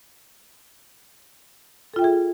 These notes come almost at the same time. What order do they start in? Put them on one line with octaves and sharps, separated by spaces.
A4 F4 G5 E5 G#4